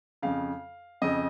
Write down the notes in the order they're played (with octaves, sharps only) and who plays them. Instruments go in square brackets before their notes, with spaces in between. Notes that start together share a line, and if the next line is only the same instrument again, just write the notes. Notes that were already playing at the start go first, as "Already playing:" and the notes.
[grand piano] F2 C#3 F5
F2 C#3 D#5